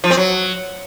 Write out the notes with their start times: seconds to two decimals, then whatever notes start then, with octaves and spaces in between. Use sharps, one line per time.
0.04 F3
0.11 C4
0.17 F#3